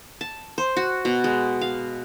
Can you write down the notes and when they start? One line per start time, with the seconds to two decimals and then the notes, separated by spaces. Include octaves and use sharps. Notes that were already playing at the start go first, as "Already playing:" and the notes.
0.21 A5
0.58 C5
0.77 F#4
1.05 B2
1.24 G#3
1.61 F5